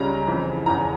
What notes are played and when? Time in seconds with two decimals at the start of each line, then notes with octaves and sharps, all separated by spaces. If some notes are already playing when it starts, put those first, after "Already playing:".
Already playing: C#2 C#3 G3 C#4 A#5
0.27 F2 C#3 E3
0.66 E1 E2 C#3 E3 A#5